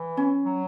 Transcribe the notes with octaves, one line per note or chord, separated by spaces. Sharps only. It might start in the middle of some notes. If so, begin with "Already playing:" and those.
Already playing: E3
C#4
F#3